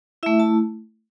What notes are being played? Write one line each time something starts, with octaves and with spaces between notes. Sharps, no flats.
A3 E4 E5
A5